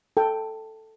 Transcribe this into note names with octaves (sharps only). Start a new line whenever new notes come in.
A4 G5